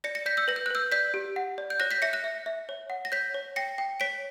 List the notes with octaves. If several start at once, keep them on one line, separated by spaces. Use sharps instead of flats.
D5 A#6 C#7
A#6 C#7
D5 G6 B6
E6 G6
B4 A#6
G6
F#6
B4 E6 G6
D5 G6 B6
G4
F#5
D5
G6
C#5 F#6 A#6
G6 B6
E5 A#6 C#7
F#6 A#6
E5
E5
C#5
F#5
A#6
C#5 G6 B6
C#5
G5 A#6 C#7
G5
C#5 B6 D7